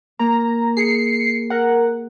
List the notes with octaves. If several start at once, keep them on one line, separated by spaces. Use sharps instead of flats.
A#3 A#5
G#4 C7 C#7
A#4 F#5